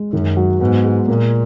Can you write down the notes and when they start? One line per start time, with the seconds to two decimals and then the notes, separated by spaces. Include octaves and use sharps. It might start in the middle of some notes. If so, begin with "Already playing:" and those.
Already playing: G#3
0.13 F#2 D#3
0.37 F#3
0.61 G#2 B3
0.84 G#3
1.08 A#2 A#3